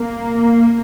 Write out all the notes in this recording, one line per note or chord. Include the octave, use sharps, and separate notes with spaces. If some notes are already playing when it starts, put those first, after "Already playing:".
Already playing: A#3